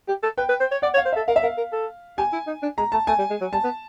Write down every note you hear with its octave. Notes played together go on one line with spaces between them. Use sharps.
G4
A4
B4 G5
B4
C5
C#5
D5 F#5
C#5
F5
C5
A4 E5
A#4 F5
E5
A#4 F5
A#4
A4
G4 G#5
E4
D#4
D4
G#3 A#5
A3 A5
A3 G#5
G3
G#3
F#3
G3 A5
B3